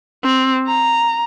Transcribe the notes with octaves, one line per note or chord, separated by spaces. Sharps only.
C4
A#5